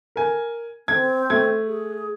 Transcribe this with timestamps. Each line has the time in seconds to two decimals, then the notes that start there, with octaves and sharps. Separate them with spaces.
0.16 A#4 G#5
0.88 C4 G#6
1.30 A3 G#6
1.67 G#4